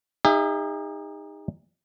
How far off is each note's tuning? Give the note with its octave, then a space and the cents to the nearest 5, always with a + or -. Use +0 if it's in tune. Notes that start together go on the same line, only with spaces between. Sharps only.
D#4 +0 G#4 -45 E5 +25